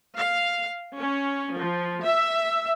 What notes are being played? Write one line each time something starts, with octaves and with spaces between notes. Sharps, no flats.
F5
C#4
F3
E5